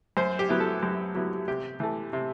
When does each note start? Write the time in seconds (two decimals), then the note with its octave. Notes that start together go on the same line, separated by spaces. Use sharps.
0.17 F#2 C5
0.39 G4
0.49 F#3 B3 E4
0.60 A4
0.82 F#2 G4
1.15 F#3 B3 E4
1.48 C3 G4
1.80 E3 A3
2.13 C3